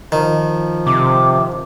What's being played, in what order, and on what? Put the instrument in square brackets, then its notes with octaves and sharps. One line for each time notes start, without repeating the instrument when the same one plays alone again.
[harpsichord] D#3 [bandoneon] F3
[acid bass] C3 [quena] D6